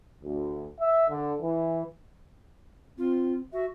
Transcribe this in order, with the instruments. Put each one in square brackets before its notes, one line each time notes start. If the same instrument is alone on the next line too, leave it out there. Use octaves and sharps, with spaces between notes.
[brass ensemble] D2
E5
D3
E3
[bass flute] C4 [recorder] F4
[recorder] F#4 [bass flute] E5